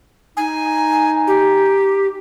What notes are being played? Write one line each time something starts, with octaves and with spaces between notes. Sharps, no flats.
D#4 G#5
G4